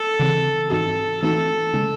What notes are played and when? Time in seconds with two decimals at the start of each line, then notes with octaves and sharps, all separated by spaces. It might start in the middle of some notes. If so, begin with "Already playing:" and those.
Already playing: A4
0.20 C#3 E3 C4
0.70 G#2 E3 C4 D#4 F#4 A4
1.23 E3 A3 C4 D#4 F#4 A4
1.74 C#3 G#3 C#4